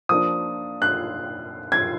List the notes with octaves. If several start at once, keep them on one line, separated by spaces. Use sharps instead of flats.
F3 A#3 D4 D#6
F#6
G#6